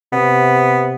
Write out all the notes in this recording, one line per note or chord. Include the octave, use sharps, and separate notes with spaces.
C3 B3